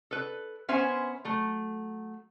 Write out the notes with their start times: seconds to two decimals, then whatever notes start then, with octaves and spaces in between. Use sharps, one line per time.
0.11 A4 B4
0.69 B3 C#4 C5 E5 G#5
1.25 F#3 A3